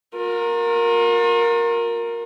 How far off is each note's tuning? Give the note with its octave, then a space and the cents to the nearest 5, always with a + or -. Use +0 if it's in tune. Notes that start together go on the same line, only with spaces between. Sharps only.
F4 +45 A#4 +0